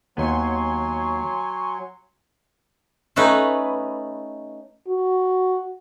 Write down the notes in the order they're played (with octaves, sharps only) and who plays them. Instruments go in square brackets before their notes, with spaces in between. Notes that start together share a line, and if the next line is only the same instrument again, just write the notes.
[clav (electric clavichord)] D#2 B3 [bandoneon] F#3 [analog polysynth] G#5 C6 C#6
[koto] A3 C#4 D#4 B4
[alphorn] F#4